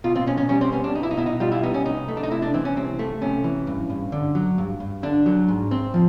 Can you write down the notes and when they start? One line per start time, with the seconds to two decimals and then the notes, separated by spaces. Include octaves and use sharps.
0.04 B2 F4
0.16 C4
0.26 B2 C#4
0.38 C#4
0.49 G3 C#4
0.61 C4
0.72 B3 C#4
0.84 D4
0.95 B2 D#4
1.03 E4
1.11 D#4
1.17 B2 E4
1.26 D#4
1.40 G3 F4
1.52 E4
1.63 B3 D#4
1.74 C#4
1.85 C2 D#4
2.08 A3
2.17 D4
2.23 D#4
2.31 C3 E4
2.42 D4
2.54 E3 C4
2.65 C#4
2.76 C2 C4
2.99 A3
3.21 C3 C#4
3.44 E3
3.67 G2
3.90 G2
4.12 D3
4.35 F#3
4.58 G2
4.80 G2
5.03 D3 D4
5.26 F#3
5.48 G#2
5.71 C4
5.94 F3